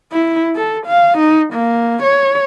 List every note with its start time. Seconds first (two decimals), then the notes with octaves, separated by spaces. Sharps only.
0.12 E4
0.56 A4
0.86 F5
1.18 D#4
1.53 A#3
2.03 C#5